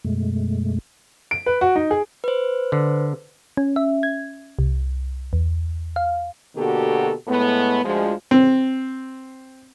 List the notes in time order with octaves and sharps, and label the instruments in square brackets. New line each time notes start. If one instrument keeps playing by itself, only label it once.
[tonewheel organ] F#2 B2 G#3 A3
[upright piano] D7
B4
F#4
D#4
G#4
[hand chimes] B4 C5
[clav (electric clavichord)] D3
[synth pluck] C#4
E5
G#6
C2
E2
F5
[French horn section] B2 D3 A#3 F#4 G4 A4
A2 G#3 A3 B3
D2 F3 G#3
[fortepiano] C4